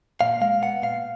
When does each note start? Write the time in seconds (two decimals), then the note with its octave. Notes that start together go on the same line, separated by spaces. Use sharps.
0.21 A#2 F5
0.41 G#3 F5
0.62 B3 F#5
0.82 A#2 F5